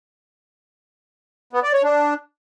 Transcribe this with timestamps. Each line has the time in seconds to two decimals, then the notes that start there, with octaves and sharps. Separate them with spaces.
1.53 B3
1.63 D5
1.73 C#5
1.84 D4